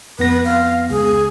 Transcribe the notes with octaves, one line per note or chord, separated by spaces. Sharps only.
F2 B3 B4 A#6
F5
C#2 G#4